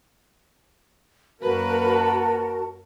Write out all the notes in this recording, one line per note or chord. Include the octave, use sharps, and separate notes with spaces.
F#2 A#3 F#4 A#4 B4 A5